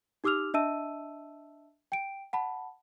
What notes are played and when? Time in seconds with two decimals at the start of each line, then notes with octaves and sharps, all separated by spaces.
0.24 D#4 G4 D6 E6 F6 F7
0.54 D4 D#5 E5 A5 E6 D#7
1.92 G5 D7
2.33 F#5 A5 B5